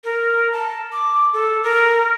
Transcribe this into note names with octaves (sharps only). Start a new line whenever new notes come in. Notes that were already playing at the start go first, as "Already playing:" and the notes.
A#4
A5
D6
A4
A#4